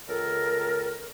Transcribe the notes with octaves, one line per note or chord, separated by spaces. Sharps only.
C#2 A4 A#4